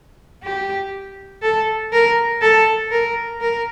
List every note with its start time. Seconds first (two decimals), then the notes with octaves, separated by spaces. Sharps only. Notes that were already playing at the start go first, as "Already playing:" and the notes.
0.43 G4
1.42 A4
1.92 A#4
2.42 A4
2.91 A#4
3.41 A#4